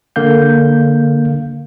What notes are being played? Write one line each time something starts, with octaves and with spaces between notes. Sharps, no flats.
D3 A#3 F5 G6